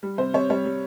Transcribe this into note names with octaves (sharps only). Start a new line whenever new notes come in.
G3
C3 C5
C3 C#5
G3 C#5
G3